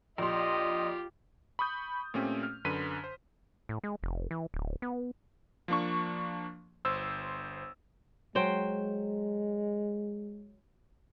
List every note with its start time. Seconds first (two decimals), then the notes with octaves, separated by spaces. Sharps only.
0.18 A#1 F4 G4 D#5 C6
1.59 B5 C#6 D#6 G6
2.14 A#2 A3 C4 C#4 G4
2.43 F6
2.65 F#2 D3 B4 C6 B6 D#7
3.04 C5
3.69 A2
3.84 G#3
4.03 F1
4.31 E3
4.54 D1
4.82 B3
5.68 F3 A#3 D4 C#6
6.85 G1 C5 E6
8.35 F#3 G#3 C5 G5